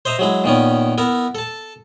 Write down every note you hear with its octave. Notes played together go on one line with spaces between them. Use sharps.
C5 D#5 E5 A#5
F#3 G#3 E4
A#2 D#3 B3 C#4
B3 E4 A#4 E5
A4 A5